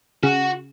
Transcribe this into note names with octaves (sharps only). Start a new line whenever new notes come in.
C#3 F#4